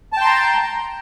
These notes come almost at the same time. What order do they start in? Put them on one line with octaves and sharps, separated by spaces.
A5 G5 C6 A#5